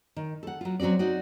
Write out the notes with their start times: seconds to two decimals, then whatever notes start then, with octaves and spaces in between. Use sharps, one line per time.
0.16 D#3
0.43 A4 F#5
0.61 F#3 F4
0.80 F#3 C4 C#4 F#4 D5
0.99 D#4 F#4 D5